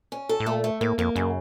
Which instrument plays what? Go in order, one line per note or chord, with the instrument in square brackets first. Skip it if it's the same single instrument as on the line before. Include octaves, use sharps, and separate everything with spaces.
[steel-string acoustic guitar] C#4
A4
[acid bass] A2
[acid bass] A#2 [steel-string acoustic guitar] A3
[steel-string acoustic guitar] A3
[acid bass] A2 [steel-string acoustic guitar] A#3
[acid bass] F2 [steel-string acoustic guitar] A#3
[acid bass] F#2 [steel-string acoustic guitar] C#3